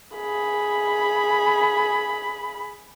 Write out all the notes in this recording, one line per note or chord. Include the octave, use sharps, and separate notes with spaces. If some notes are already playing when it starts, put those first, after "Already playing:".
G#4 B5